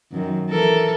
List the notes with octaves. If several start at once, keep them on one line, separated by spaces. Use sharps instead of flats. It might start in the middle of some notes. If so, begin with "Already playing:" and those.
F#2 D#3
E3 A4 A#4